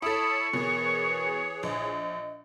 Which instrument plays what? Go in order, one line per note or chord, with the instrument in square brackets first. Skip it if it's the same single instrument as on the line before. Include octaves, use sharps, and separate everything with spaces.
[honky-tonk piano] E4 A4 [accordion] C#5 A5 B5 [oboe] C#6 [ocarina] D#6
[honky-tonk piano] B2 [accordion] E3 G#4 C#5 [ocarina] A#4
[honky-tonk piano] A#1 [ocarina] D#5